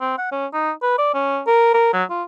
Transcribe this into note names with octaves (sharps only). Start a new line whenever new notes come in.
C4
F#5
C#4
D#4
B4
D5
C#4
A#4
A#4
F#3
F4